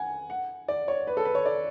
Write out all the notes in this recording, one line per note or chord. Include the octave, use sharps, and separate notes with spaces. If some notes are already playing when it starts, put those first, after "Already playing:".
Already playing: F#5 G#5
F#5
D5
C#5
B4
A4
B4
C#5
D5